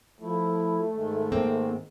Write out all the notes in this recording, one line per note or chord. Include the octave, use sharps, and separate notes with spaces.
F3 A3 E4
G#2 D#3 G#3
A#3 C4